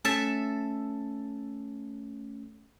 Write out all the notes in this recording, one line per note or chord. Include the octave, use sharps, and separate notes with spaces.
A3 C#4 A4 E5 A5